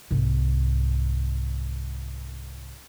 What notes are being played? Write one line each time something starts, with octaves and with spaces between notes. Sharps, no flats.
C2 G#2